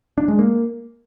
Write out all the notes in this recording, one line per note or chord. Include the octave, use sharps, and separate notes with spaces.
D4
G#3
A#3